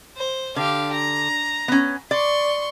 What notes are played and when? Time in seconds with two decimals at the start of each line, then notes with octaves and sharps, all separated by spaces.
0.17 C5
0.56 D3 G4 F5
0.93 A#5
1.68 B3 C#4
2.11 D5 C6 C#6